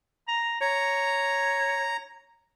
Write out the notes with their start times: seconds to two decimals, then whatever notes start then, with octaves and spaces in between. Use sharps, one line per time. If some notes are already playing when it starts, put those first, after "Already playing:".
0.28 A#5
0.61 C#5 A#5